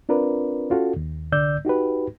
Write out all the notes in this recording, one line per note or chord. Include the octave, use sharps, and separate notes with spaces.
C4 D4 F4 A#4 B4 D5
C#4 F4 F#4 A4
D#2
C2 D3 D5 E6 G6
D#4 F#4 G4 B4